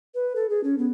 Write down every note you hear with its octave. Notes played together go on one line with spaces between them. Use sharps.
B4
A4
G#4
C#4
B3